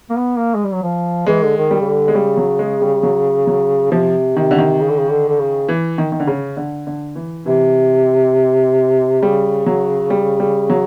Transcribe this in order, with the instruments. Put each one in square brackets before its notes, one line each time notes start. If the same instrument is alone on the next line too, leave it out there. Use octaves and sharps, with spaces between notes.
[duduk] A#3
B3
A#3
G#3
G3
F#3
F3
[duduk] E3 [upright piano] G#3
[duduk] D3
D#3
[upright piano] G3
[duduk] C#3
D3
[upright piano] G#3
[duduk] C#3 [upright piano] G3
[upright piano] F#3
G#3
G3
F#3
F#3
[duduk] C3 [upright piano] F3
[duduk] C3 [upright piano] D#3
[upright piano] D3
D#3
[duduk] C#3
D3
C#3
D3
D3
C#3
[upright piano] E3
D#3
D#3
D3
C#3
D3
D3
E3
[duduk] C3 [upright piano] E3
[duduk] C#3 [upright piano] G3
[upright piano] F#3
G3
G3
F#3